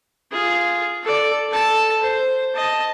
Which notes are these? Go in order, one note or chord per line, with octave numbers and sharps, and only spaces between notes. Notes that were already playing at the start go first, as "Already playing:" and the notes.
F4 G#4
A4 D5
A4 A5
C5
D#5 A5